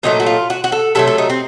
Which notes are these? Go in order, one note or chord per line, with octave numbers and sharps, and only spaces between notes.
A#2 F#3 A3 D#4
F#4
F4
F#4
F#4
A4
C3 F#3 A3 A4
A4
D#4
C4